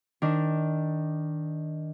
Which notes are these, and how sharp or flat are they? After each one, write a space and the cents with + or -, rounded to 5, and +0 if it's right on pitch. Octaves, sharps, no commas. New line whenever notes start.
D#3 +10 D4 +0